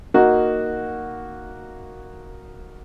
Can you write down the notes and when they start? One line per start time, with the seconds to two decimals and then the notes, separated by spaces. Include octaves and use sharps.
0.14 A#3 D#4 F#4